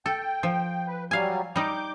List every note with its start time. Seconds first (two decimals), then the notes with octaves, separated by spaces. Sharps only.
0.06 A4 G5
0.43 F3
0.87 B4
1.11 F#3 G3 F5 G#5
1.56 G3 D#4 D6 G6